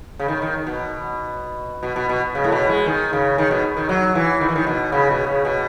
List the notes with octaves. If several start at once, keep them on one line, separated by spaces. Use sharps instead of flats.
C#3
D#3
D#3
B2
B2
B2
B2
C#3
A2
B2
G#3
D#3
C#3
D#3
B2
D#3
F#3
E3
D#3
E3
D#3
B2
C#3
B2
C#3
B2